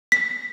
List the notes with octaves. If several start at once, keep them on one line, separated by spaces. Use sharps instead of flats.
B6